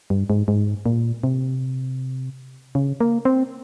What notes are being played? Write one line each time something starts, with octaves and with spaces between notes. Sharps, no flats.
G2
G#2
G#2
A#2
C3
C#3
A#3
C4